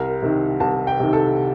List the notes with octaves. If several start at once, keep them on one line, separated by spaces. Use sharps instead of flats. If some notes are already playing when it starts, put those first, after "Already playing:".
Already playing: C2 A#4
C3 D#3
C2 A5
G5
C3 D#3
A4